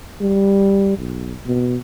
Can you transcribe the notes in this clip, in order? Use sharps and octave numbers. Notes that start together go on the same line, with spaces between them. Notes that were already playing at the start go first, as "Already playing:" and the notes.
G3
B1
B2